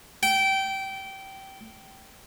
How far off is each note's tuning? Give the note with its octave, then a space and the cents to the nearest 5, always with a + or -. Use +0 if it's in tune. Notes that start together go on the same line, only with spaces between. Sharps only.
G5 -20